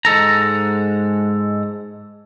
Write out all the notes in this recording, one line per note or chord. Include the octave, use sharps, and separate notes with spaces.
G#2 G#3 A4 A#5